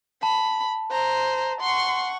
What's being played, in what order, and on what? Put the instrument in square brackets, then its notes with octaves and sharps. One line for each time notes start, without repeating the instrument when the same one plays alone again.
[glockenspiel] A5 [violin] B5
[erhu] C5 [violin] A#5
[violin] F#5 C#6 [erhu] C6